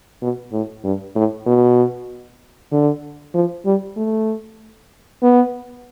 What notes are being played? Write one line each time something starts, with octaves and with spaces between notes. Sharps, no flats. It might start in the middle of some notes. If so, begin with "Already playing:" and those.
B2
A2
G2
A2
B2
D3
F3
G3
A3
B3